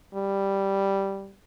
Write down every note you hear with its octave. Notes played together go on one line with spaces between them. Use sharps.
G3